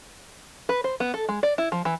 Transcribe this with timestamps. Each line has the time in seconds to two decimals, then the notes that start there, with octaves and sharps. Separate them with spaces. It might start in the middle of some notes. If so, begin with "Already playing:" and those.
0.69 B4
0.84 C5
1.00 B3
1.14 A4
1.29 G#3
1.43 D5
1.58 E4
1.72 F3
1.85 E3